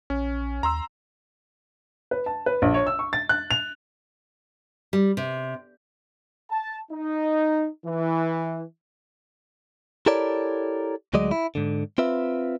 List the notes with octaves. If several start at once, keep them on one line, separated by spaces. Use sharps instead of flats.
A#1 C#4
D#2 A#5 C6 E6
B4
A5
B4
A#1
C#5
E6
C#6
A6
F#6
F7
G3
C3
A5
D#4
E3
E4 G4 A4 A#4 C#5 D5
D2 F#3 G#3 D5 D#5
E4
G#2 D3
C4 F4 B4 E5